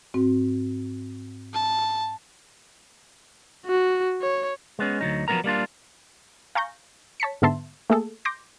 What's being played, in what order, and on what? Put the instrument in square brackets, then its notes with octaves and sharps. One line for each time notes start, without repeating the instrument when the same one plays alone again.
[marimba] G#2 C4 F#4
[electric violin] A5
F#4
C#5
[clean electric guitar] G#3 B3 C#4
D2 F#3 D#4
F3 F#3 A#3 B3 A#4 A#5
G3 A#3 D4 F4
[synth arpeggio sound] F5 G#5 A#5 C#6 G6 A#6
C#5 A5 B6 C#7
G#2 D3 B3 E5 A5 C6
A3 A#3 G#4 A4
C6 D6 G6 A#6